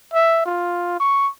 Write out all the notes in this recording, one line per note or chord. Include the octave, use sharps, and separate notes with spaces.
E5
F4
C#6